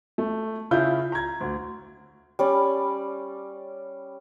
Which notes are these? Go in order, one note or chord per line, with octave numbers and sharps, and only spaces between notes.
A3
C#3 E4 F4 G6
A#5 G#6
D2
G3 C#4 D5